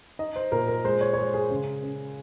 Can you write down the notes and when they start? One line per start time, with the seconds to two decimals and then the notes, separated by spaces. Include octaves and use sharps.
0.19 D#4 D#5
0.36 C5
0.52 A#2 A#4
0.68 A#4
0.85 G#3 C5
1.01 C#5
1.13 C#5
1.17 G#3 C5
1.34 G#4
1.50 C#3
1.82 C#4